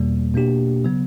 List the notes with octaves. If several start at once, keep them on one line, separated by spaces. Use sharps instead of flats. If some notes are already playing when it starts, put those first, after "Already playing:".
Already playing: E2 B2 G3 A#3
B2 A#3 D4 G4
C#3 F#3 B3